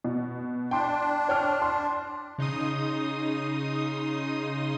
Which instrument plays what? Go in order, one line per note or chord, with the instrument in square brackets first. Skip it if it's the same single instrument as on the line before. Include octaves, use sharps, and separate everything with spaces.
[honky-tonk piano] B2
[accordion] D4 [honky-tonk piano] G5 C6
[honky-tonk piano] C#5 G5 F6
C6
[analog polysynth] C#3 D#4 C6 D#6